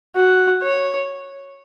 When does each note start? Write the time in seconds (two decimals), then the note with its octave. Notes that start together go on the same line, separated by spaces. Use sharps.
0.16 F#4
0.63 C#5